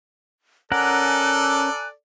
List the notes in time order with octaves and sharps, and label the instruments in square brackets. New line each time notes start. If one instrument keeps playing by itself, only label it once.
[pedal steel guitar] C#4 A#4 F#5 [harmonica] A4 D5 [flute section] G#5 A#5 F#6